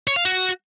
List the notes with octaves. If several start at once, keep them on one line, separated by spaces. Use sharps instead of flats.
C#5
F5
F#4